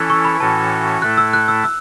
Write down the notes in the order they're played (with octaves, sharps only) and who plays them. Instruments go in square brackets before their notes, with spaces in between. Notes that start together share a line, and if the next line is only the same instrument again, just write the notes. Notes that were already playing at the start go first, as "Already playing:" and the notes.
Already playing: [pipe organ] E3 C#4 E4 A4 [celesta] E6 F#6
[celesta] C#6
B5
[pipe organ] A2 E3 C#4 F#4 A4 [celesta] A5
[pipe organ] A2 A3 E4 A4 [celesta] F#6
[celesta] E6
F#6
E6
E6